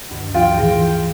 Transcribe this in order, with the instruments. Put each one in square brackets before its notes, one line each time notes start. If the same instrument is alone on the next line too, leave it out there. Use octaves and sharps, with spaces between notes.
[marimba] D2 G2 D#3
[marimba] F3 [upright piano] F4 [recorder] G5
[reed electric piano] A2 E3 [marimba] G#4 C6 A#6